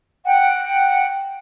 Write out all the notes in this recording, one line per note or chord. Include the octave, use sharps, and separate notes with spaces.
F#5 G5